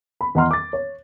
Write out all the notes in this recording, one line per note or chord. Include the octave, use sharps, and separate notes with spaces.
B5
E2 D#5 F#5 A#5 C6 F6
D6 A6
C#5